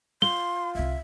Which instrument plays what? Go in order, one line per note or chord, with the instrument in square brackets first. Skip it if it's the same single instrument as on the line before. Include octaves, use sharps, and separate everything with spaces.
[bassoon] F4 [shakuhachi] C6 [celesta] G7
[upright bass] F1 C2 [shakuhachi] E5